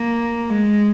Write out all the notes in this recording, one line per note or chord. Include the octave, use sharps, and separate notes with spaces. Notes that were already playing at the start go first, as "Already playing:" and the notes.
Already playing: A#3
G#3